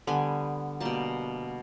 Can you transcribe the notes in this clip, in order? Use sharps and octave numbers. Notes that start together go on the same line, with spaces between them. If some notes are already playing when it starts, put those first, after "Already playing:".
D3 G3 B3 G#5
B2 G3 A#3 A5